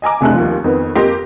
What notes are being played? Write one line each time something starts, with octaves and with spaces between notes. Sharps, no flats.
D#5 G#5 A#5 D6
F1 C3 G#3 A3 D4 F#6
D#2 F3
F2 D#3 B3
F2 A#3 G4 D#5 C6 A#6